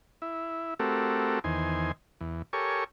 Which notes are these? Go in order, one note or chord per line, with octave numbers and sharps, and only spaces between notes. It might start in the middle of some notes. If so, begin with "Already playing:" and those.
E4
A3 C4 F#4 G4 A4 A#4
E2 D#3 C5 G#5
E2
G4 A4 A#4 C#5 G#5 C#6